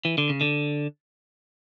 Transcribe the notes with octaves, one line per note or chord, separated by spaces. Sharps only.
E3
D3
C#3
D3